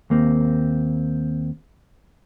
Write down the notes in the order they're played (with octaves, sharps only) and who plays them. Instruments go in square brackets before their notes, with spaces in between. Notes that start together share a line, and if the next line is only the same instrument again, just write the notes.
[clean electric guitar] D#2 A#3 C4